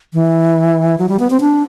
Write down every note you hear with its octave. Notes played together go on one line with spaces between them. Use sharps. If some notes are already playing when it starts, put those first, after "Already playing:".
E3
F#3
G3
B3
C4
D4